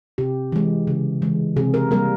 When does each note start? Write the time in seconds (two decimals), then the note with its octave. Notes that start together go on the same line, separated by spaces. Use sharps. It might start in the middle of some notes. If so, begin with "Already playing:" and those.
0.18 C3 G4
0.52 E3 G#3
0.87 C#3
1.22 E3 G#3
1.57 C3 G#4
1.74 A#4
1.91 G3 A#3 A#4